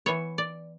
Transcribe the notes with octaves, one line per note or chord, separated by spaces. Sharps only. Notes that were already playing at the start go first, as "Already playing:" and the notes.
E3 B3 C#5
D5